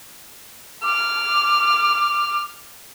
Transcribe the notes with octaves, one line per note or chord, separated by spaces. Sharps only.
D6 F6